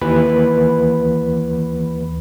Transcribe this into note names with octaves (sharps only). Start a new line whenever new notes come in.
D#2 E3 B4 B5